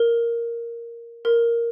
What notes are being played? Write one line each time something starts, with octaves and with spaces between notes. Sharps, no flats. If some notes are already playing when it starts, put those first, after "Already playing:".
Already playing: A#4
A#4